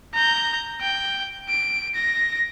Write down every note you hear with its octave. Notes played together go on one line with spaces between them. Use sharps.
A#5 G6
G5
D7
A#6